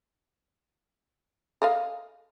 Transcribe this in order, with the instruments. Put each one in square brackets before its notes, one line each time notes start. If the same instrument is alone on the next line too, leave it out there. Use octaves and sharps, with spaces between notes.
[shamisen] A4 D#5 F5